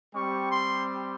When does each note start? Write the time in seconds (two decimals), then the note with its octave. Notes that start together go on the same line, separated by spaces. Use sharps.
0.14 G3 C4 G4 C#6
0.52 C6